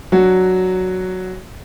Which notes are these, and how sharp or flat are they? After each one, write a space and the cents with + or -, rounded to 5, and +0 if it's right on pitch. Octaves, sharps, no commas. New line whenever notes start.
F#3 +0 D4 +0 F#4 +0